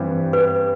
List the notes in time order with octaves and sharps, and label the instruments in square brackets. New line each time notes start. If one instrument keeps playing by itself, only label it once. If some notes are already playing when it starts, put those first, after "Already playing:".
Already playing: [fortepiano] G2 E3 G3 C4
[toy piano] B4